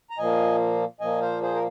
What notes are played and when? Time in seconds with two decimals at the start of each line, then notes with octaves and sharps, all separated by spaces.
0.10 A#5
0.18 A#2 F3 A#3 D#5 G#5
1.01 A#2 F3 A#3 D#5 G#5
1.21 C5 F5
1.42 G#4 C5
1.55 A#4